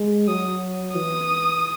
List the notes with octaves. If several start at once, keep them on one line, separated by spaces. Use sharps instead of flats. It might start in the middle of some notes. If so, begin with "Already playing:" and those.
Already playing: G#3
F#3 D#6
E3 D#6